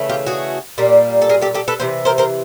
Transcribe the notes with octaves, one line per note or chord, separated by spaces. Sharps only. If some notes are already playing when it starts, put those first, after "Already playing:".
Already playing: C#3 E3 A3
F4 G4
F#4 G#4
A#2 G3 A#3
A4
G#4 A#4
G4 A4
G4 A4
A4 B4
C3 E3 C5
A#4 C5
A#4 C5